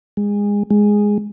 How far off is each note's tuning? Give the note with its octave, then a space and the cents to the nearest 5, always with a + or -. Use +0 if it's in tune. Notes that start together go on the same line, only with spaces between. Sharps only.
G#3 -25
G#3 -5